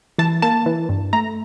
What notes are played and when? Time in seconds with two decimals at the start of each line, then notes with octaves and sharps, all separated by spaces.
0.18 E3 A5
0.42 A#3 A5
0.66 E3
0.89 G2
1.13 A3 A#5